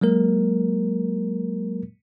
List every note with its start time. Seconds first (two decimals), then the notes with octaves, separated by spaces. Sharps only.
0.01 F#3 G#3 A#3 A#4